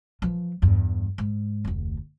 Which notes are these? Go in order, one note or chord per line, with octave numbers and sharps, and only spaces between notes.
E3 F3
E2 G2
G#2
F1 D2